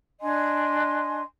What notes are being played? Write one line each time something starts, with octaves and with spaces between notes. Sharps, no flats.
D4 D#5 G#5 C6